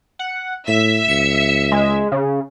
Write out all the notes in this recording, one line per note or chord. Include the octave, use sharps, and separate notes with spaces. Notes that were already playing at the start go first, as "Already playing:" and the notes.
F#5
A2 E5 B6
C#2 C#7
G#3
C#3